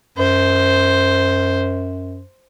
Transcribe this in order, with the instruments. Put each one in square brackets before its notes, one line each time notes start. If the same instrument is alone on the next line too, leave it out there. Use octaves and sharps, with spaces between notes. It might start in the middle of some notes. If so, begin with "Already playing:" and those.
[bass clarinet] F#2 [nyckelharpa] C5